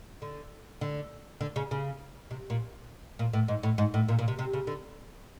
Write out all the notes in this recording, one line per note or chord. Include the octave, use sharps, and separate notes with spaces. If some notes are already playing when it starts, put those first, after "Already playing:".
D3
D3
D3
C#3
C#3
C3
A#2
A#2
A2
G#2
A2
G#2
A2
A#2
A#2
C3
C3
C#3
D3